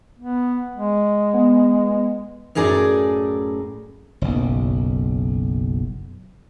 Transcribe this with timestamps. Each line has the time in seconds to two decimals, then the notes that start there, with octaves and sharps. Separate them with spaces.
0.19 B3
0.76 G#3
1.33 B3
2.55 F#2 A2 G#4 A#4 D5
4.22 F#1 B1